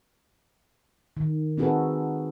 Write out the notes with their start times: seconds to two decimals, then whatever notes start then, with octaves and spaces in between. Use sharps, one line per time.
1.17 D#3
1.58 C4 D#4 F#4 G#4 A4 B4